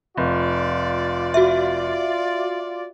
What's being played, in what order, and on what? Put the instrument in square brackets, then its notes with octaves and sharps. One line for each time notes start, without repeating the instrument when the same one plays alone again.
[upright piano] F1 [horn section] F4 D5
[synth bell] F#4 E5